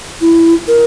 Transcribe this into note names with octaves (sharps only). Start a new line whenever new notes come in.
E4
A#4